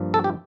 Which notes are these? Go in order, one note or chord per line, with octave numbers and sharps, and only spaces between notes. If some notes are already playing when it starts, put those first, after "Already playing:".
Already playing: G2 F3 A#3
A4
G4